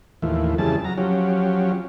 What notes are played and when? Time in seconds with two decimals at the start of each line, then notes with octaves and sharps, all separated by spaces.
0.22 D#2 A2 E3 F3
0.58 F2 C#3 E3 G3 G#4 A5
0.85 F#3 A#5
0.97 F3 F#3 C#4 G4